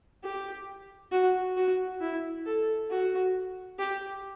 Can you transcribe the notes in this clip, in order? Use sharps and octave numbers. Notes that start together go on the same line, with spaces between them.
G4
F#4
F#4
E4
A4
F#4
G4